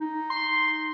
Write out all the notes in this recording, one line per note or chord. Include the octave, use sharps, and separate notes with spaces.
D#4
C6